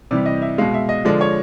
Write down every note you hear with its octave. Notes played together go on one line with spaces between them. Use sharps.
C3 E3 G3 D5
D#5
E5
B2 G#3 F5
E5
D#5
D3 F3 G#3 D5
C#5